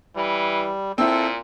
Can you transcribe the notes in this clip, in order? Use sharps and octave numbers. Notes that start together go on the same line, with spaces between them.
E3 G3
A#2 C4 E4 A4